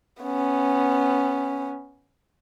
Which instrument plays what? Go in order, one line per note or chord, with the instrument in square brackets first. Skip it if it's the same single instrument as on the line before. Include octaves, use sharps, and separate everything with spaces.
[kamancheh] B3 C#4